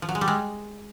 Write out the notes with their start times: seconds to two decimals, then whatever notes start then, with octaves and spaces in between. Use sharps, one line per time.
0.02 F3
0.09 F#3
0.15 G#3
0.21 G3
0.28 G#3